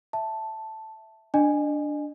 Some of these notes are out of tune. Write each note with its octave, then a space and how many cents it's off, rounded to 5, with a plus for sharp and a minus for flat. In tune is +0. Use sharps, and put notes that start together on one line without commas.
E5 +0 A5 +0
D4 +0 D#5 -35 G#5 +0